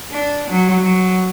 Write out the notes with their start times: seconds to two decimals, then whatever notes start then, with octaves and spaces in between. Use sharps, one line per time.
0.11 D4
0.50 F#3
0.82 F#3